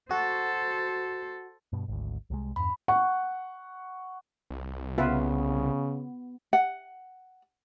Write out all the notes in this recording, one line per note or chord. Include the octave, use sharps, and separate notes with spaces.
F#4 A4 C5
G2 B2
G#1 D2
C2 C3 G#3
E2 G2 B5
F#5 C#6
C2
C#3 B3 F4 B4 E5
F#5